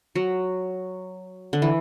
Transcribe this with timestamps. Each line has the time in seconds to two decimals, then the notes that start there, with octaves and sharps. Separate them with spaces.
0.15 F#3
1.53 D3
1.62 E3